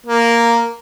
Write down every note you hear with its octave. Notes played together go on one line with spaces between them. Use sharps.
A#3